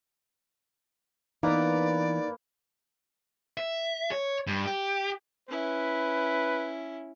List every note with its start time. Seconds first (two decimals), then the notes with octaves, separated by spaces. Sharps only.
1.43 E3 A#3 B3 D#4 B4 D5 A#5
3.57 E5
4.11 C#5
4.47 G2
4.65 G4
5.49 C#4 E4 B4